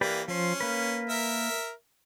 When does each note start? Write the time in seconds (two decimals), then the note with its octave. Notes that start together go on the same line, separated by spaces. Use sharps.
0.01 E3 A#3 G4 B4 D5
0.28 F3 C#4 C5
0.60 A#3 B4
1.09 A#4 E5